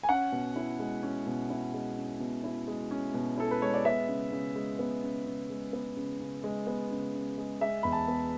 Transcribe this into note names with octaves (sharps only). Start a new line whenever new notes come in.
G#5
C#4 F#5
B2
E4
G#3
C#4
B2
E4
G#3
C#4
B2
E4
G#3
C#4
B2
E4 A4
B4
G#3 C#5
D5
B3 E5
C#3
C#3
G#3
B3
C#3
C#3
G#3
B3
C#3
C#3
G#3
B3
C#3
C#3
G#3
G#3 E5
E2 B5
A5
B3